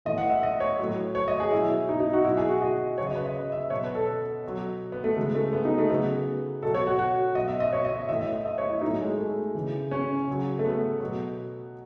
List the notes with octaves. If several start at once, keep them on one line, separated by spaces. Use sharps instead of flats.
A2 E3 D#5
F#5
E5
D#5
C#5
A2 F#3
C#5
D#5
G#4
B2 F#3 E4
D#4
D#4
F#4
B2 F#3 E4
G#4
F#4
D#5
C#3 F#3 C#5
D#5
B4
D#5
E5
B2 F#3 C#5
B4
A4
B2 F#3
B3
A3
C#3 E3 G#3
A3
B3
D#4
A3
C#3 F#3 B3
B2 F#3 A4
C#5
F#4
F#4
B2 F#3 D#5
E5
D#5
C#5
D#5
E5
A2 E3 E5
D#5
E5
D#5
C#5
E4
A2 F#3 D#4
G#3
A3
C#3 E3
C#4
C#3 F#3
A3
B3
B2 F#3